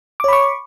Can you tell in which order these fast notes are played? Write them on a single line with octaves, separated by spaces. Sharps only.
D6 C#5 B5 C#6